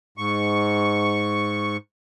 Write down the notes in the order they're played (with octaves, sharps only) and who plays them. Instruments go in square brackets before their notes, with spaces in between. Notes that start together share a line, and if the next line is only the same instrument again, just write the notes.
[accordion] G#2 C#6